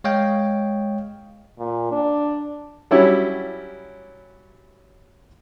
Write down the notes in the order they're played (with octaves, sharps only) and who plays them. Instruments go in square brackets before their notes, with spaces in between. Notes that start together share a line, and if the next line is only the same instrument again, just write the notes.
[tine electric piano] G#3 C#5 D#5 F5 G5
[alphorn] A#2
D4
[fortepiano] F#3 G3 C#4 E4 G4